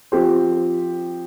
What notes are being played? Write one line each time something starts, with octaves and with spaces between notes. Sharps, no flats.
F3 C4 G4 C5